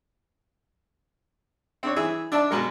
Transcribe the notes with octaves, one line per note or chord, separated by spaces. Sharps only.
C4 D4 C#5
E3 G#4 E5
D4 D5 E5 A5
B2 F#3 G#3 A#4